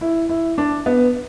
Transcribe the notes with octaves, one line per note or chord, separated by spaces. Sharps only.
E4
E4
D4
B3